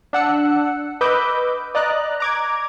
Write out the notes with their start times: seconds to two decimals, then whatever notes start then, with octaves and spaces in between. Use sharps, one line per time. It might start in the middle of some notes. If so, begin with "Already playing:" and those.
0.13 D4 F#5 E6 C#7
1.01 B4 D#5 B5 D6 E6 G6
1.75 D5 D#5 A#5 F#6
2.20 A#5 D6 G#6